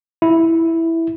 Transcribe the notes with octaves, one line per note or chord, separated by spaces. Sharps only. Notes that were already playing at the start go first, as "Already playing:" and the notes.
E4